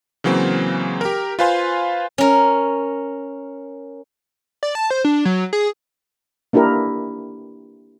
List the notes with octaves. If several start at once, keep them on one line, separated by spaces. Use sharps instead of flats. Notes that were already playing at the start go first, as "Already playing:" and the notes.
C#3 E3 F#3 A#3 C4
G4 A#4
F4 B4 C5 F5 G#5 C6
C#4 A#4
D5
A5
C5
D4
F#3
G#4
A#3 D4 E4 G4 A#4